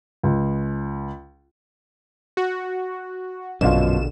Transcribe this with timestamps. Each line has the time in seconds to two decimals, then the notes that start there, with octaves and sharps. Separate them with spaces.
0.23 C#2
2.37 F#4
3.61 A#1 F#2 B2 D3 F4 E7